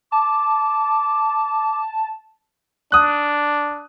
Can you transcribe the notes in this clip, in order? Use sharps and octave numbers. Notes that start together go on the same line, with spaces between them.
A5 D6
D4 D#6 F#6